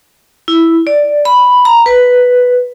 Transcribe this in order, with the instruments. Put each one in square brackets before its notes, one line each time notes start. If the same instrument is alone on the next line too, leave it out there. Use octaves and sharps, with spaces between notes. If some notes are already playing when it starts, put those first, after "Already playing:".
[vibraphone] E4
D5
B5
A#5
B4